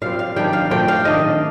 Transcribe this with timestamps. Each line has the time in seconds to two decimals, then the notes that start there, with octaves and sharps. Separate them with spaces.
0.02 A#2 G3 C4 F5
0.19 F5
0.36 D#3 G3 A#3 D4 G5
0.53 F5
0.71 A#2 A3 C4 G5
0.88 F5
1.05 D#3 A3 D4 D#5